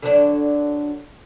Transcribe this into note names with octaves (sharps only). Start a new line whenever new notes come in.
D3 F#3 D4